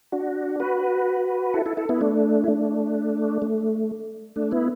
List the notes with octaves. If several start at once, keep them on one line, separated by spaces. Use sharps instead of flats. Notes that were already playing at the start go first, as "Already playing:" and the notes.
D4 F#4
F#4 B4
E4 A4
E4 A4
E4 A4
B3 E4
A3 D4
E4
A3 D4
A3
A3 D4
B3 E4